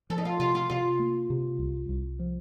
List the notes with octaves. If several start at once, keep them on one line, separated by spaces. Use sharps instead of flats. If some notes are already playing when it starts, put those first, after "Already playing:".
F3 A4
D#4
F4
C3 F4
F4
C3 F4
A#3
C3
C2
C2
F3